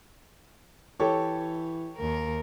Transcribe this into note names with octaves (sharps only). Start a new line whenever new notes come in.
E3 G4 A4 C#5
D#2 A#4